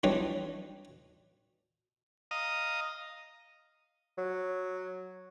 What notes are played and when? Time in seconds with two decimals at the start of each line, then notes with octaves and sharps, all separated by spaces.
0.03 F2 E3 G3 D4 D#4 C#5
2.31 D#5 F5 A#5 D#6
4.18 F#3